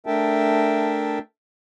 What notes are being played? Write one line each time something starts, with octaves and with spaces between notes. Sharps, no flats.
A3 D4 A#4 E5 G5 A5